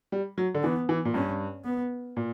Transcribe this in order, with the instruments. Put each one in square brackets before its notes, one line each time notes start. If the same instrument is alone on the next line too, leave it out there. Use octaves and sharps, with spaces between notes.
[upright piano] G3
F#3
D3
[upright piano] E3 [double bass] B3
[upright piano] E3
A#2
[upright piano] G2 [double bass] C#4
[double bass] B3
[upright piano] A#2